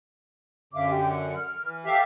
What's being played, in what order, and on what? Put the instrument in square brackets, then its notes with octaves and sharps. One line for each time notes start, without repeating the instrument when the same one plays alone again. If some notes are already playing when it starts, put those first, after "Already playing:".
[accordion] F#2 D3 [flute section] E5 F5 D6
[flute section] G4
F#5
F6
[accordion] E3
[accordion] G4 E5 F5 [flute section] A4